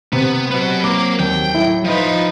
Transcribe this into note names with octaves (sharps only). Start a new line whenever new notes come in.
C3 B3
F#3 F#4 B4
A#3 D6
D#2 G5
A2 E4
F3 D#4 B4